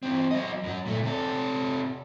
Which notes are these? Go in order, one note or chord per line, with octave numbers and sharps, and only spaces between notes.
E3 C4
F#3 D#5
F#2 F#3
A#2 A3
C3 A4